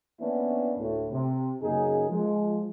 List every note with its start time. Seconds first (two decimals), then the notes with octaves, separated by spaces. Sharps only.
0.20 E3 A#3 B3 C#4 D4 E4
0.78 D2 A2
1.12 C3
1.63 F#2 C#3 A#3 D#4 G#4
2.08 F3 G#3